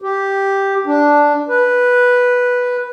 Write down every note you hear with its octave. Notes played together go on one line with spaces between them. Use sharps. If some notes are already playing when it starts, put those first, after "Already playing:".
G4
D4
B4